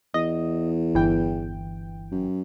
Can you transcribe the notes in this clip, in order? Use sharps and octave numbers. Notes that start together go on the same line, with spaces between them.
E2 D#5
G1 E3 G5
F#2